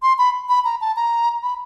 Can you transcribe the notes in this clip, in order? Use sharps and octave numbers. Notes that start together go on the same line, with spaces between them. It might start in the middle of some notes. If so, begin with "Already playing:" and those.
C6
B5
B5
A#5
A5
A#5
B5